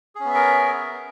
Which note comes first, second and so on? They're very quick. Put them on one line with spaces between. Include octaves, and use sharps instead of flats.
G#4 C#4 B3 E5 A#4